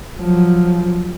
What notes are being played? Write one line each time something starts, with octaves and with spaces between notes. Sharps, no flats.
F3 F#3